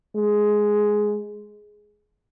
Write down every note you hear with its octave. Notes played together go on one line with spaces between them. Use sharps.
G#3